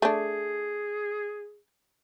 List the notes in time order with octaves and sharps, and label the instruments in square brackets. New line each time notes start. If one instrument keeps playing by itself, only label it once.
[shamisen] A3 D4 [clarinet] G#4